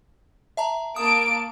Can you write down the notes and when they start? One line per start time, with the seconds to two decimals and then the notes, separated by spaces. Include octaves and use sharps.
0.57 E5 A5 A#5
0.96 A#3 A5 D#6 D7